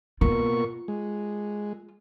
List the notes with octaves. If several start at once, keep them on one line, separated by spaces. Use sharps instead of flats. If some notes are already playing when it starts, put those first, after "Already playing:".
B2 A#3 F4 C#6
G#3